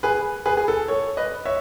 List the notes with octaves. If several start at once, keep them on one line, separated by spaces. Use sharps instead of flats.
G#4 B4
G#4 B4
G#4
A4
A4 C#5
B4 D#5
C#5 E5